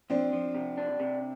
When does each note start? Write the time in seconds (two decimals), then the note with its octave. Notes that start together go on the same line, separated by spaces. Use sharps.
0.10 F3 C4 D4
0.33 F3
0.55 C3
0.78 D4
1.00 C3